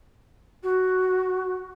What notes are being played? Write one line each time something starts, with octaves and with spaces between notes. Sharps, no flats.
F#4